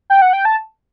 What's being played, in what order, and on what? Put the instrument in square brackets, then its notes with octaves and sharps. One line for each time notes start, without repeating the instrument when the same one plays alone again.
[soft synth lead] G5
F#5
G5
A5